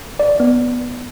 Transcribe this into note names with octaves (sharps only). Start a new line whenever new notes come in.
D5
B3